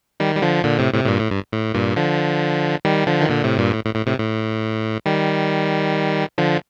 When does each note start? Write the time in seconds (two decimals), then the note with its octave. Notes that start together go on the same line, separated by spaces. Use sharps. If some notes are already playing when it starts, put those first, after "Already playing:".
0.20 D#3 G3
0.36 G3
0.42 D3 F3
0.64 A#2 D3
0.79 A2 C3
0.93 A2 C3
1.04 A2
1.08 G2 A#2
1.19 A2
1.31 G2
1.52 A2
1.74 G2 A#2
1.96 D3 F3
2.85 D#3 G3
3.07 D3 F3
3.21 D#3
3.29 A#2 D3
3.44 A2 C3
3.58 G2 A#2
3.73 A2
3.84 A2
3.95 A2
4.06 A2 C3
4.18 A2
5.06 D#3 G3
6.38 D3 F3